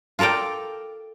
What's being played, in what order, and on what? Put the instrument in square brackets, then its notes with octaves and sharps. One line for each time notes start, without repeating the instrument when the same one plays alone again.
[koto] F4 A4 A#4 D5 G5